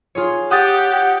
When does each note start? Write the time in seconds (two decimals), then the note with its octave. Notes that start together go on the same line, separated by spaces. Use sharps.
0.15 F4 G#4 C#5
0.51 G4 F#5 D#6 A6